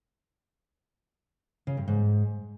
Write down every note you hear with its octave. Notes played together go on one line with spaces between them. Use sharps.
C#3
G2
G#2